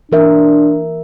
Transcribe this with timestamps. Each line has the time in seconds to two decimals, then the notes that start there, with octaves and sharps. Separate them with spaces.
0.12 E3 D4 A#4 E5